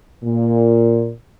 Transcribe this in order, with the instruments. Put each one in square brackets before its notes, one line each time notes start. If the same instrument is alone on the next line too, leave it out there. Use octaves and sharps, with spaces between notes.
[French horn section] A#2